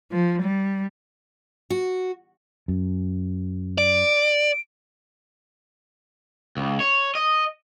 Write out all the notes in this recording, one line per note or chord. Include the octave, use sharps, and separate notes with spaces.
F3
G3
F#4
F#2
D5 D7
C#2
C#5
D#5